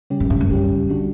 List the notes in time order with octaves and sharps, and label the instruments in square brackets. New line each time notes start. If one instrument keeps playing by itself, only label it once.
[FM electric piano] C#3 G3 C#4 G4
[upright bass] F#2
G2
F#2
[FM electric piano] C#3 G3 C#4 G4
D3 G3 D4 F#4